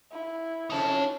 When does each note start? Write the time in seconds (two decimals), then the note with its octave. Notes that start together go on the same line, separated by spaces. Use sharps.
0.12 E4
0.70 F2 C#3 C#4 D#4 A5